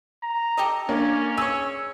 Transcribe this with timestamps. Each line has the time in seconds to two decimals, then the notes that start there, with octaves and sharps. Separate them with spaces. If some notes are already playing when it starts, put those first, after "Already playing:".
0.23 A#5
0.57 G4 A4 D#5
0.89 A#3 C#4 D4
1.37 G#4 C#5 E6